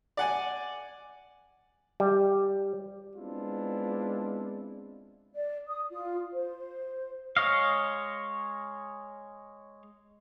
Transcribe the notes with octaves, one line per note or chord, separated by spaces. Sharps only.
D5 F#5 G#5
G3
G#3 B3 C4 D4 E4 F4
D5
D#6
F4
C5
G#3 C#5 D#5 F5